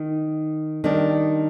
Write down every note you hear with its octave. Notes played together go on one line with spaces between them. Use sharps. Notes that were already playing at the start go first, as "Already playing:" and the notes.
Already playing: D#3
D#3 G3 D4